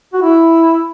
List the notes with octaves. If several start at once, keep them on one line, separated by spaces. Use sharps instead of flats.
F#4
E4